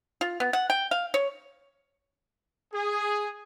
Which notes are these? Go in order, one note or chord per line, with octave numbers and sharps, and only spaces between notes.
F4
B3
F#5
G5
F5
C#5
G#4